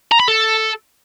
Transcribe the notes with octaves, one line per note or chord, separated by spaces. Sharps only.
A#5
B5
A4